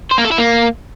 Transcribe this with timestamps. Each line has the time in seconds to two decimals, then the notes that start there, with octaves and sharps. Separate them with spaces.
0.11 C5
0.18 A#3
0.25 A4
0.32 E4
0.38 A#3